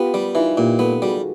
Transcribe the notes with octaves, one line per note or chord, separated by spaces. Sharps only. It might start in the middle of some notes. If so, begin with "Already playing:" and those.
Already playing: B3 F4 G4
G3 F4 G4
E3 D#4 F4
A#2 F4 G4
B3 A4 B4
G3 F#4 G#4